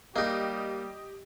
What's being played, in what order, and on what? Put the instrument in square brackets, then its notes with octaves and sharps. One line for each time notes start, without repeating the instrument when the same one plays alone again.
[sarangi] G3 [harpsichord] A#3 D#4 [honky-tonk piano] G4 D#5